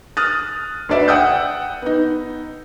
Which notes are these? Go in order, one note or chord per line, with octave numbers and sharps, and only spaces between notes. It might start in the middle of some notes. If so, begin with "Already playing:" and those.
D#6 F6 F#6 A6
D2 B4 D5 E5
F#5 G5 D#6 E6 F#6 G6
B3 D#4